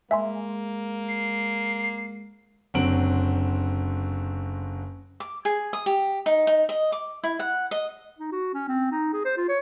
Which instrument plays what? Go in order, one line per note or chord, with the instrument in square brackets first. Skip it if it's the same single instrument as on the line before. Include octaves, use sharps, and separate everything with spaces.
[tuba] G#3 [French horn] A#3 [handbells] E5 G#5 C6
[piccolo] C7
[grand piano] F#1 D3 F#3 C4 D7 F#7
[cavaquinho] D6
G#4
D#6
G4
D#4
D#4
D#5
D6
E4
F#5
D#5
[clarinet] D#4
F#4
C#4
C4
D#4
G#4
C5
F4
C#5